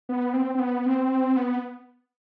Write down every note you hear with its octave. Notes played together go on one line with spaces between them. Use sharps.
B3
C4
C4
B3
C4
B3